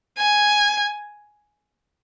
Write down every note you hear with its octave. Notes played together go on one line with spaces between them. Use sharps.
G#5